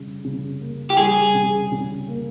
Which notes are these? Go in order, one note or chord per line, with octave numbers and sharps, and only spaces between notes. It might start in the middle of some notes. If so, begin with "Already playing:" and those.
Already playing: C#3 G3
C#3
A#3
G4
G3 G#4
C#3
C#3
A#3